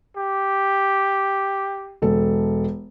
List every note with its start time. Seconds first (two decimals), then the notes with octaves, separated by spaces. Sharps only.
0.17 G4
2.02 E1 A4